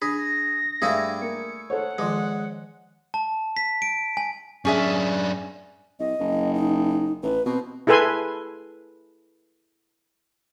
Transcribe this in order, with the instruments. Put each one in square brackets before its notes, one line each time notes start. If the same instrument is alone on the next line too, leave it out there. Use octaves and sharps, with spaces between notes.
[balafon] D4 [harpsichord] G#4 [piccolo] A#6
[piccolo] A#6
[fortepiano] G2 [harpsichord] A3 E4 G#4 [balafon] E5 F5
[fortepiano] A#3 [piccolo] C#7
[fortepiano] A4 C5 C#5 [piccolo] F#5
[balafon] D#3 F3 F4 [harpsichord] G#3
[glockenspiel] A5
B6
D7
G#5
[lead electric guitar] F#2 D4 [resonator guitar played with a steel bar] C#4 G#4 E5
[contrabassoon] C2 [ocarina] D#5
[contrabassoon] F#1
[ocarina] D#4
[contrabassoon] A1 [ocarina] B4
[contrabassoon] B2 [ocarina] C4
[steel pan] E4 G#4 A4 B4 G#5 C6